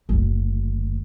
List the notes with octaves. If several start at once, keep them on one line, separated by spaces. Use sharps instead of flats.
F#1 D2